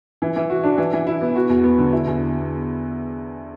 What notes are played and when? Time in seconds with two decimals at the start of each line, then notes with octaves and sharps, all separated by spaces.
0.22 E3
0.36 E3
0.50 F#4
0.64 D4
0.78 E3
0.93 E3
1.07 E4
1.21 B3
1.35 F#4
1.49 E2
1.64 B3
1.78 D3
1.93 E4
2.07 E2